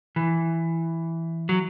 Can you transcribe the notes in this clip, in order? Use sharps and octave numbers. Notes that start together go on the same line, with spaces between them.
E3
F#3